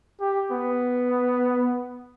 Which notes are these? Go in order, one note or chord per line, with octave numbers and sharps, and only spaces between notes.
G4
B3